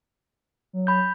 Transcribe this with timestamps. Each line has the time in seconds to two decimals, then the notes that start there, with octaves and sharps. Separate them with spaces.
0.73 F#3
0.87 B5 G6